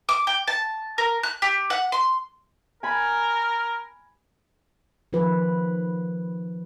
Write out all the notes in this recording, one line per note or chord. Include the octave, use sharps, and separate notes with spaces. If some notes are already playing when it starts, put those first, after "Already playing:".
D6
G5
A5
A#4
F#6
G4
F#5
C6
A#4 G#5 B5
D#3 F3 F4 B4